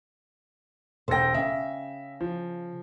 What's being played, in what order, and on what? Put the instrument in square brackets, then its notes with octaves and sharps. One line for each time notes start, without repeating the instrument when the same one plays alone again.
[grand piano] E1 A4 A#6 [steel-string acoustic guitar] C5 G5
[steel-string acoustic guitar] C#3 [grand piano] E5
[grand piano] F3